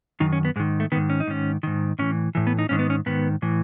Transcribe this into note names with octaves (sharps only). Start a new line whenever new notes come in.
F#2 D#3 D#4
C#4
B3
G#2 D#3 G#3
A3
G#2 D#3 B3
C#4
D#4
G#2 D#3 C#4
G#2 D#3
A2 E3 C#4
A2 E3
B3
D#4
G#2 D#3 C#4
B3
C#4
G#2 D#3 B3
A2 E3